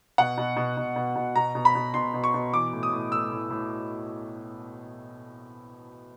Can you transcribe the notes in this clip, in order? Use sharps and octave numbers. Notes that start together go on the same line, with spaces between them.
B2 F#5
B2
B2
B2
B2
B2
B2 A#5
B2
B5
B2
B2 C6
B2
C#6
B2
E3 D6
A2
D#6
A2
A2 E6
A2
A2